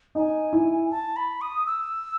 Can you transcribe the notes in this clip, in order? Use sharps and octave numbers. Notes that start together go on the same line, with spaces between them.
D#4 G#5
E4
A5
B5
D#6
E6